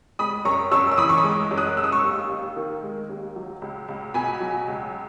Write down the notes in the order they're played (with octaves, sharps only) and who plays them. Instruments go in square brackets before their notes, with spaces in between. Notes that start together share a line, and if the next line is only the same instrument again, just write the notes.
[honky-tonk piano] G#3 B5 D#6
F#2 A#5 C#6
F#2 C#6 E6
E6
E3 B5 D#6
C#6
B5 D#6
G#3
F#2
D#6 F#6
G#3 E6
D#6
C#6 E6
D#2
D#2
D#3
G#3
D#2
F#3
C#2
C#2
B2 G#5 B5
F#3
C#2